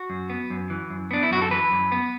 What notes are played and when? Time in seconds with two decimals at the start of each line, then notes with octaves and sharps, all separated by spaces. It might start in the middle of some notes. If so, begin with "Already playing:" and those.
Already playing: F#4
0.10 F#2
0.30 B3
0.50 F#2
0.70 E3
0.90 F#2
1.11 B3 D4
1.23 E4
1.31 F#2 F#4
1.42 A4
1.51 E3 B4
1.71 F#2
1.92 B3